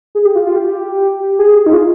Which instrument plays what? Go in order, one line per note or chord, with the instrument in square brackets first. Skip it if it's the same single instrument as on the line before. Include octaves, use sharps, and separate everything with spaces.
[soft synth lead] G#4
G4
F4
F4
G4
G#4
D#4
F4